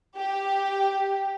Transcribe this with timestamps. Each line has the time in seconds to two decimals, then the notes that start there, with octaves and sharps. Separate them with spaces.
0.17 G4